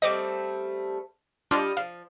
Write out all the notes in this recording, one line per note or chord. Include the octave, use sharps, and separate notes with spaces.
G3 A3 C4 D#5 D6
G3 D4 F4 D#5 F5
F3 F5